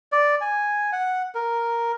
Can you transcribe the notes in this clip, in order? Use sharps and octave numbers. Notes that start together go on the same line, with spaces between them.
D5
G#5
F#5
A#4